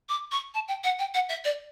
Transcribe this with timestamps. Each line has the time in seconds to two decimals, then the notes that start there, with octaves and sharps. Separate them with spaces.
0.09 D6
0.32 C#6
0.54 A5
0.68 G5
0.84 F#5
0.99 G5
1.14 F#5
1.29 E5
1.44 D5